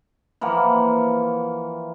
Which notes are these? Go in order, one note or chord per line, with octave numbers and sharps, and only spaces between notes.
E3 F3 A#3 F#5